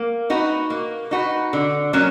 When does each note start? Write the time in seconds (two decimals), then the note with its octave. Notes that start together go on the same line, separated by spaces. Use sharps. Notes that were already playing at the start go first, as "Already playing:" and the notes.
Already playing: A#3
0.30 D#4 F#4 B4
0.70 A#3
1.11 D#4 F#4 B4
1.53 D3
1.93 F#3 A#3 C#4